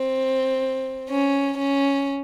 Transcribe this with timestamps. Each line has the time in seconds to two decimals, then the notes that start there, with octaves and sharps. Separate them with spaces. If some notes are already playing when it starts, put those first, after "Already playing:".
Already playing: C4
1.09 C#4
1.58 C#4